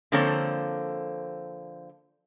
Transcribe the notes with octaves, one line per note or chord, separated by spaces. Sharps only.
D3 F3 A#3 C4 A4 C#5